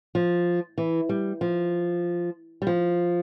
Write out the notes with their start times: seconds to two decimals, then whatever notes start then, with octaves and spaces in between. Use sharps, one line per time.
0.15 F3
0.78 E3
1.09 G3
1.41 F3
2.62 G3
2.67 F3